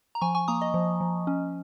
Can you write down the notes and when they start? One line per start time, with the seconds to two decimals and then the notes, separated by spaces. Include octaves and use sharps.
0.15 A#5
0.21 F3 G#5 C#6
0.35 G#5 C#6
0.48 A#3 A#5 D#6
0.62 D#5
0.74 F3
1.01 F3
1.27 C#4